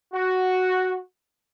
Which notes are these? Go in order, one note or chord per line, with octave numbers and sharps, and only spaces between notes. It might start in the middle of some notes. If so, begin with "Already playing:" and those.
F#4